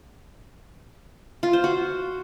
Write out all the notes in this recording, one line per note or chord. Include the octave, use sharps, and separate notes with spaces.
F4
C5
F#4